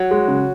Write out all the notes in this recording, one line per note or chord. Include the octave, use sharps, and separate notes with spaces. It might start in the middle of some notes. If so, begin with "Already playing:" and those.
Already playing: F#3
G#3
C#3